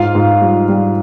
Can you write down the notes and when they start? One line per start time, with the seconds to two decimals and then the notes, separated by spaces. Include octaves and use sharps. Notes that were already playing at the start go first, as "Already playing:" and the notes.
Already playing: G#2 F4 F5
0.15 G#2
0.42 G3
0.68 G3